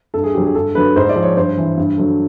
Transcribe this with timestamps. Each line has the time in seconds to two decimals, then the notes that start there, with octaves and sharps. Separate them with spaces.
0.14 G2 A4
0.24 G#4
0.35 D3 G4
0.38 F#3
0.45 G#4
0.55 G2 A4
0.75 D3 F#3 B4
0.96 G#2 C5
1.09 D5
1.16 F3
1.23 C#5
1.37 G2 C5
1.58 E3
1.77 G2
1.98 D3 F#3